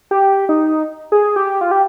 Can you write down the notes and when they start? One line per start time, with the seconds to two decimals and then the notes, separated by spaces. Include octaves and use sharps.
0.11 G4
0.49 D#4
1.12 G#4
1.36 G4
1.61 F4
1.71 G4